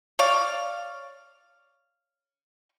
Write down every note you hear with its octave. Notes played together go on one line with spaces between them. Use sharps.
C#5 D5 F5